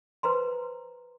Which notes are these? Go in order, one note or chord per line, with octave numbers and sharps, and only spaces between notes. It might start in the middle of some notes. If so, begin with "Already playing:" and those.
B4 C5 A#5 C6